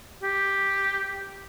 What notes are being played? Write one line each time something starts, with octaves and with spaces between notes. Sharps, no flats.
G4